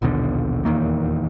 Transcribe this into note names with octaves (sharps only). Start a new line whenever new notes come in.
A#1 D#2 B2 D3
D#1 E2 D#3 A#3